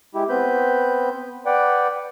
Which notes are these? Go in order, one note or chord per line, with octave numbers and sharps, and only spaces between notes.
G#3 E4 G4
B3 C4 B4 B5 G6
B4 D5 F#5 G5